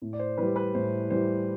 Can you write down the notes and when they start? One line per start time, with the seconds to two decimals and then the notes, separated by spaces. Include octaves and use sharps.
0.02 A2
0.13 D5
0.19 C5
0.38 E3 G3 B4
0.56 B4
0.74 A2 C5
1.10 E3 G3 C5